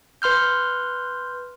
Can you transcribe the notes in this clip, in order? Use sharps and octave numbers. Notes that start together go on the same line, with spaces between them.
B4 C6 F6 G6